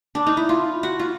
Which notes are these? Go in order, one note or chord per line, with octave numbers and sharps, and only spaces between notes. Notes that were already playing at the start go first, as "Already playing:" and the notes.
D4
D#4
E4
F4
F#4
F4